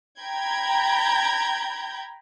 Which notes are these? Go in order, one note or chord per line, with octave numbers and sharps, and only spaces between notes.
G5 A#5 B5 G6 G#6